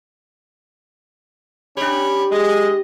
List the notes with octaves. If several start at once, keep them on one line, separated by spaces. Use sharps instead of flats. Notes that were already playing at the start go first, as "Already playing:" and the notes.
C#4 D4 G4 C#5 B5
G#3 D#5